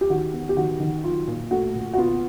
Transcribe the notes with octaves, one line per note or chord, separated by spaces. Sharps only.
G4
D#3 F#4
B3
G4
D#3 F#4
D#3
F#3 F4
A#2
A3 F#4
A#2
F#4
B3 F4